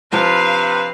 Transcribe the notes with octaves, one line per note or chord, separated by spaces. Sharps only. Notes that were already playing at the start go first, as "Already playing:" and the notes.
C3 F3 D4 F4 B4 F5